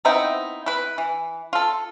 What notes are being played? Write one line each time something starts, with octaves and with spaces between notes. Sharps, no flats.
B3 C4 D#4 E4
E4 B4
E3
F4 A4